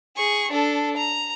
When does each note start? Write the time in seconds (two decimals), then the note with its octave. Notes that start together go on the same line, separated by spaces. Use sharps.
0.17 G#4 C#6
0.52 D4 A4
0.97 A#5